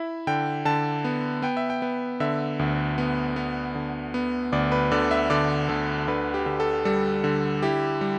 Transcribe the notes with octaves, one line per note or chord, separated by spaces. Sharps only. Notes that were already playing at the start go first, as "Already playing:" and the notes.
Already playing: E4 E5
D3 G5
D3 A5
B3
B3 G5
E5
G5
B3
D3 E5
D2
B3
B3
D3
B3
D2 D5
B4
D3 D5
E5
D3 D5
D2 A4
D3 B4
G4
D3
A4
G3 A4
D3
E4 G4
G3